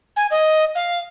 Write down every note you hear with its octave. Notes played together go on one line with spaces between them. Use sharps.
G#5
D#5
F5